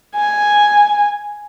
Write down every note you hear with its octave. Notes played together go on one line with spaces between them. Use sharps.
G#5